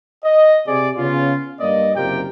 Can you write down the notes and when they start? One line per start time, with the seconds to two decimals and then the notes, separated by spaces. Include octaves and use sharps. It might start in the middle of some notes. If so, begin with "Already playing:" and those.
0.24 D#5
0.67 C3 G#4 D5
0.98 C#3 B3 C#4 F4
1.60 G2 A#3 D5 D#5
1.96 F#1 C3 F4 G4 A#4 G5